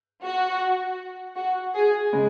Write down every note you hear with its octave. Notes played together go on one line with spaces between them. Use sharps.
F#4
F#4
G#4
C#3 G#3